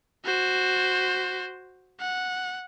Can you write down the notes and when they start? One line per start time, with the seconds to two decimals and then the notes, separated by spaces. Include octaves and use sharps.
0.24 F#4 C5
2.00 F#5